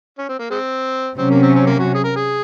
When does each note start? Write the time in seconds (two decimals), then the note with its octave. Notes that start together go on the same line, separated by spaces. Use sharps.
0.18 C#4
0.29 C4
0.39 A#3
0.51 G#3 C4
1.18 C3 F#3 C4 C#4
1.30 A#3
1.42 C4
1.55 C4
1.67 A#3
1.80 F#4
1.95 G#4
2.04 A#4
2.16 G#4